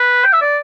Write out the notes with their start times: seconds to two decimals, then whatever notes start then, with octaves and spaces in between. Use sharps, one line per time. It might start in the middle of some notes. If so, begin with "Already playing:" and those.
Already playing: B4
0.24 G5
0.33 E5
0.41 D5